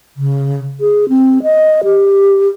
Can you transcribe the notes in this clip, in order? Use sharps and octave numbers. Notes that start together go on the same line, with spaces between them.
C#3
G#4
C4
D#5
G4